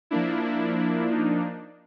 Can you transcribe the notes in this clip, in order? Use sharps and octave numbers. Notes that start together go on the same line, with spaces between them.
F3 A#3 D4 E4
E4
E4
D#4